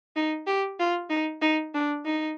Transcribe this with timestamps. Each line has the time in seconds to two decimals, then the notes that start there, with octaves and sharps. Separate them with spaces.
0.16 D#4
0.47 G4
0.79 F4
1.10 D#4
1.41 D#4
1.74 D4
2.05 D#4